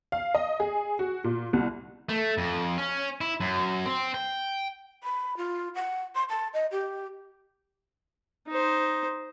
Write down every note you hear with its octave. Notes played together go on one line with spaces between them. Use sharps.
F5
D#5
G#4
F#4
A#2
C2
A3
F2
C#4
E4
F#2
C4
G5
B5
F4
F#5
C6
A5
D#5
G4
D#4 C5